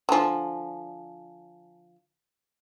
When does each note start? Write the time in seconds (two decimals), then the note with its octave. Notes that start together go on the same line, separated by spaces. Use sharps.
0.09 D3 F3 G#5 A5